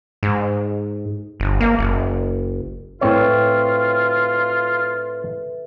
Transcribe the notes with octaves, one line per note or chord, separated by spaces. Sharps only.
G#2
G1
A#3
F#1
A2 C4 F4 A4 B4 C#5 E5